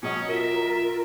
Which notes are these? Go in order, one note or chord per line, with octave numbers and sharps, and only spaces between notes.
B2 F#3 C#4 D#5
F4 A#4 E5